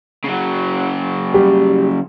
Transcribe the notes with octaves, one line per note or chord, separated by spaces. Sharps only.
C#3 F#3
G3